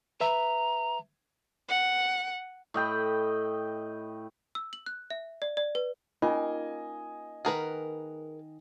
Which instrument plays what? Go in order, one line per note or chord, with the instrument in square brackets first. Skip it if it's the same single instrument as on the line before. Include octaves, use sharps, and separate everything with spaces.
[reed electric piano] B4 E5 [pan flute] A#5
[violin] F#5
[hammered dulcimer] A2 D#5 G5 B5
[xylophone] E6
F#7
F#6
E5
D5
D5
B4
[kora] A#3 [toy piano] C#4 D#4 F4 [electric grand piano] D#5 G#5
[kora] D#3 F#5 [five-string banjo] G#4 A#4 B4